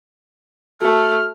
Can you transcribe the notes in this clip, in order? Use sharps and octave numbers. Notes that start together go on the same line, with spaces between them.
A3 F#4 A5 F6